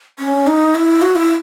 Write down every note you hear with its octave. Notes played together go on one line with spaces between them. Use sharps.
C#4
D#4
E4
F#4
E4